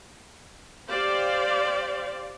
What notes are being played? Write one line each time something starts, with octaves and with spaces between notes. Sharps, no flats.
G4 C5 D5 F5